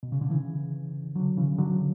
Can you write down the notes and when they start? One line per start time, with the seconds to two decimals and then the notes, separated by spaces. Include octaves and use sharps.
0.03 B2
0.12 C#3
0.21 D3
0.30 C#3 E3
1.15 D3 F#3
1.37 C#3 E3
1.58 D3 F#3